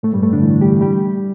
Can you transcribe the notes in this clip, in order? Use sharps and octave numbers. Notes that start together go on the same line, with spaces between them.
A2 A3
G2 G3
A2 A3
D3 D4
E3 E4
G3 G4
G3 G4